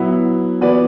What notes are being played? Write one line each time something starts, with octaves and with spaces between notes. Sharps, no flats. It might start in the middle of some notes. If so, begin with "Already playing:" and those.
Already playing: F#3 B3 E4
E3 B3 F#4 B4 D5